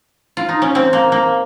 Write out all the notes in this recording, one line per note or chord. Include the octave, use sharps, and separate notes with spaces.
F4
D#4
C#4
C4
A#3
A#3